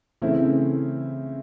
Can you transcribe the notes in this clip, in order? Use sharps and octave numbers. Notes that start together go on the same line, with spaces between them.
C#3 E3 A3 C4 E4